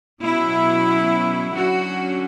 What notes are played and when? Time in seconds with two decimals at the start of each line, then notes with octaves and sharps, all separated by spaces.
0.23 B2 F#3 C#4 E4
1.54 D3 F#3 C#4 F#4